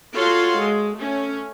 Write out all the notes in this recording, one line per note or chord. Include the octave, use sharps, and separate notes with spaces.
F4 F#4 A4 C#5 F5 C6
G#3
A3 C#4